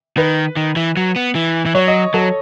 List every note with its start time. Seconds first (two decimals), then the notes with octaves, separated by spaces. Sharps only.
0.17 D#3 B4
0.57 D#3
0.76 E3
0.97 F#3
1.16 B3
1.35 E3
1.66 E3
1.75 F#3 C#5
1.88 D#5
2.14 F#3 A4